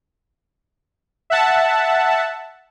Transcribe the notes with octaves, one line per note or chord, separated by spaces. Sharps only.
E5 F#5 A5